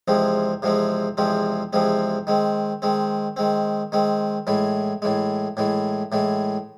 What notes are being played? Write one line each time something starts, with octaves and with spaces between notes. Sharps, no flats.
E2 C3 F3 G#3 C4
E2 C3 F3 G#3 C4
E2 C3 F3 G#3 C4
E2 C3 F3 G#3 C4
D#3 G#3 C4
D#3 G#3 C4
D#3 G#3 C4
D#3 G#3 C4
A2 E3 G#3
A2 E3 G#3
A2 E3 G#3
A2 E3 G#3